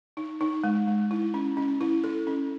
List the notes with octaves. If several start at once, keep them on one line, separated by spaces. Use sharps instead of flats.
D#4
D#4
G#3
G#3
E4
C#4
C#4
E4
A4
C#4